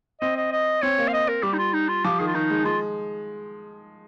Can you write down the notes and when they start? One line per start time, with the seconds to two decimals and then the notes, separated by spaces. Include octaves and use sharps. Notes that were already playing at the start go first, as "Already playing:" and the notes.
0.21 C4 D#5
0.37 D#5
0.52 D#5
0.82 C4 C#5
0.98 A#3
1.08 F5
1.13 D#5
1.28 A#4
1.43 G3 G4
1.53 D#4
1.59 F4
1.74 D#4
1.89 F4
2.04 F3 G4
2.19 D#3 G#4
2.28 F4
2.35 D#3 D#4
2.50 G#3
2.65 G#3 F4